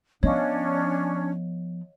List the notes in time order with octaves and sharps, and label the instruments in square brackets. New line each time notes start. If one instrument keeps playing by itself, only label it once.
[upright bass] F3 B3 [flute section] C#4 D4 [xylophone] C#5 D#5 F5